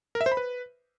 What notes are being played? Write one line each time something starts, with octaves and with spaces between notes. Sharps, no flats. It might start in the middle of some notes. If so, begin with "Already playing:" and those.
A#4
E5
C5
B5
B4